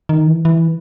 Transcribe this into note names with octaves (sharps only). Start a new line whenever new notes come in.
D#3
E3
E3